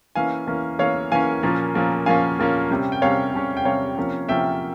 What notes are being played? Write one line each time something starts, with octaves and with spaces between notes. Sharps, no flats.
E3 A#3 C#4 F5 G#5
E3 A#3 C#4
E3 A#3 C#4 C#5 F5
E3 A#3 C#4 F5 G#5
A#2 F3 A#3 C#4
A#2 F3 A#3 C#4
A#2 F3 A#3 C#4 F5 G#5
A#2 F3 A#3 C#4
C3 G3 C#4
G5
C3 G3 C#4 C#5 F5
C3 G3 C#4
G5
C3 G3 C#4 C#5 F5
C3 F3 A#3 C#4
C3 F3 A#3 C#4 E5 G5